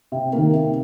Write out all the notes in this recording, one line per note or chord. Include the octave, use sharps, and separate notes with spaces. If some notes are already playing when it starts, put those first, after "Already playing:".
C3
D#3 A#3
C3